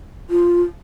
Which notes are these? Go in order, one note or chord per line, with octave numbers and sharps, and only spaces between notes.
F4